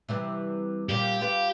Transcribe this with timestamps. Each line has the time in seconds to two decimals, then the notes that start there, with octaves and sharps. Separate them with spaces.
0.09 C3 E3 G3
0.89 A#2 F3 G3 G4
1.21 F4 B4